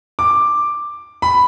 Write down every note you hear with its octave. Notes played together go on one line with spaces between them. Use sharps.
D6
B5